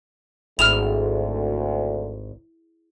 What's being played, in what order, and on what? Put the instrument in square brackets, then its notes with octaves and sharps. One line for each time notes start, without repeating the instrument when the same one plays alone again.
[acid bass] G#1 [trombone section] D2 [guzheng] E4 G#4 [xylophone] F6 E7 F7